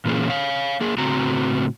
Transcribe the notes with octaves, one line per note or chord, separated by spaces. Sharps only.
A#2 E3 A#3 C#4 G#4
C#5 F5
A#3 G#4
A2 C#3 C4 F#4 A#5